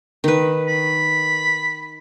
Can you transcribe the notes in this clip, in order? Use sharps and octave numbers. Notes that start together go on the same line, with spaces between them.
D#3 B4
B5